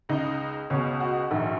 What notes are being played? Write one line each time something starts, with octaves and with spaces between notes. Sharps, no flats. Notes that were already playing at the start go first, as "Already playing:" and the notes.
C#2 C#3 D#4
C#2 B2 C#4
F#4
A#1 G#2 D#3